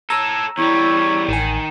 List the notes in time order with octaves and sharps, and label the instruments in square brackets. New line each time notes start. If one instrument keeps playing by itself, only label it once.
[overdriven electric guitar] A4 C#5 [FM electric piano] A#5 E6
[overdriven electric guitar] E2 G3 [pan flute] E4 [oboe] C#5
[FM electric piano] A1 G#5 [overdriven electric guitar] D#3